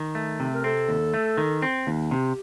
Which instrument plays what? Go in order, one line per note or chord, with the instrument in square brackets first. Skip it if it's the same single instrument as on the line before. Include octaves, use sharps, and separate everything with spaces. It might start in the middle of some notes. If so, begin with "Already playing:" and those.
Already playing: [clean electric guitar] D#3
A3
C3
[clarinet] A#4
[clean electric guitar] C4 [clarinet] A4
[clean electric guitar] D#2
A3
D#3
C4
D#2
[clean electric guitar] C3 [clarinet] G4